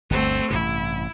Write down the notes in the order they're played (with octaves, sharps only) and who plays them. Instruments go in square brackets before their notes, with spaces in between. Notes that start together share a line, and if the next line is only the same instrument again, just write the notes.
[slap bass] G1 D2 [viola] A3 C4
[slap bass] A1 G2 C3 [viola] E4